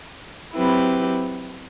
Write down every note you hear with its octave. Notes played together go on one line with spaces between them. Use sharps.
F#3 C4 E4 G4 B4